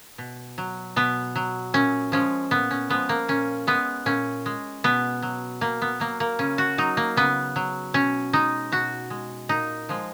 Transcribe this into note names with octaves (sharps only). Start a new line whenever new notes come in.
B2
F#3
B2 B3
F#3
A#2 C#4
F3 G#3 C#4
A#2 B3
C#4
F3 G#3 B3
A#3
A#2 C#4
G#3 B3
A#2 C#4
G#3
B2 B3
F#3
B2 A#3
B3
F#3 A#3
A#3
C#3 C#4
F#4
F#3 D#4
A#3
C#3 B3
F#3
B2 C#4
G#3 D#4
B2 F#4
G#3
A#2 D#4
F3 G#3